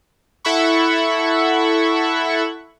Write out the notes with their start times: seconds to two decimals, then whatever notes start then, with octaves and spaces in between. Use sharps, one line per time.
0.45 E4 A4 E5 F#5 B5 C#6